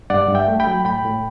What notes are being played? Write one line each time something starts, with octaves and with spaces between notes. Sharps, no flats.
G2 D5 F#5
G2
E5 G5
A3
G5 B5
F#3
A2 G5 B5
A2